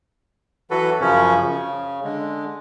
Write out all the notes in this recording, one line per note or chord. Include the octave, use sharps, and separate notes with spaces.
E3 F#3 F#4 A4 B4
F#2 C#3 F3 C#4
C#3
D3 G#3